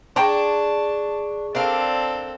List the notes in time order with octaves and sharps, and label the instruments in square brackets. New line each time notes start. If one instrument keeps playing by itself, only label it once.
[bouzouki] D4 [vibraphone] G#4 C#6 [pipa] G5 A#5 C6 [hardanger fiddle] A5
[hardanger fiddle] C4 A4 [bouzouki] D4 A#4 F5